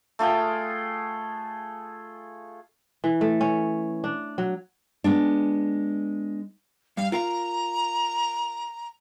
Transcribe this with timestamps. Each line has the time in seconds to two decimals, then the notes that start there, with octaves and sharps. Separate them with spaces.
0.19 A3 F4 G#4 G5
3.04 E3
3.21 A3
3.41 C#4
4.04 D4
4.38 F#3
5.04 G#3 B3 D4
6.97 G2 F5
7.12 F4 A#4 F5 A#5